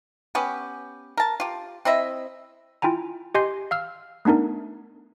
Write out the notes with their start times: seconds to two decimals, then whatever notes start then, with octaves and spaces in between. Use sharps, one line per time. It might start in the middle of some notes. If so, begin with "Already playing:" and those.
0.35 B3 C#4 G4
1.17 A#4 A5
1.40 F4 G4
1.85 C4 E4 D#5 E5
2.82 E4 F4 G5 G#5 A#5
3.35 G4 D#5 G#5 C6 G6 C7
3.71 F5 E6 F6
4.25 A3 B3 D4 D#4 A#4